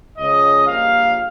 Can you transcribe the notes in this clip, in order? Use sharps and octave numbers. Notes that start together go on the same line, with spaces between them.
C#2 C#3 F3 G#3 C#4 D#5
A#1 A#2 G3 F5